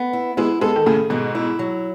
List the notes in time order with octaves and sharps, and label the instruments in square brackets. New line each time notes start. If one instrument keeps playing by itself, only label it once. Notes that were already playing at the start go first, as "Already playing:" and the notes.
Already playing: [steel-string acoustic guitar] B3
E4
[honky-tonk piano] G#3 B3 [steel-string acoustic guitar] E4
[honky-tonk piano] G#3 B3 [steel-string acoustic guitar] A4
[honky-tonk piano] D#3
[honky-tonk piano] A2 C#3 [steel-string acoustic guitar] G#4
[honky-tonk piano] G#2 B2 [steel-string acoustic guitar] G#3
[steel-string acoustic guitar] E4
F#3